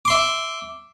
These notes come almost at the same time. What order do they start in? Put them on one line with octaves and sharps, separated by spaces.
D6 C6 E5